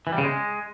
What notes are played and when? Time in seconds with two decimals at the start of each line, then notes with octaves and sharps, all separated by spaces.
0.07 E3
0.12 G3
0.18 C#3
0.24 G#3